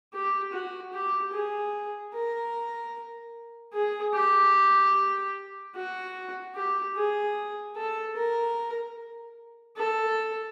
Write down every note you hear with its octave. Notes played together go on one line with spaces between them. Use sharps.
G4
F#4
G4
G#4
A#4
G#4
G4
F#4
G4
G#4
A4
A#4
A4